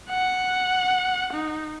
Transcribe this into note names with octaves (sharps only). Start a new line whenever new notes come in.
F#5
D#4